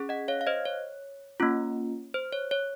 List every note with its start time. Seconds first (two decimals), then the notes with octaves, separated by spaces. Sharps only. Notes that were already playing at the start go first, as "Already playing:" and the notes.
Already playing: C#4 G#4
0.09 D#5 F#5
0.28 C#5 F5
0.41 F5
0.47 C5 D#5
0.65 C#5
1.40 A#3 C#4 F4
2.14 C5
2.32 C#5
2.51 C#5